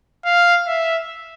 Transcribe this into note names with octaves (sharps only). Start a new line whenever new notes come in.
F5
E5